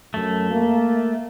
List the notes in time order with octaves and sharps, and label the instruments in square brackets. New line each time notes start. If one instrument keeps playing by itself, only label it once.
[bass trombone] F#2 [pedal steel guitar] A3
[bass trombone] A#3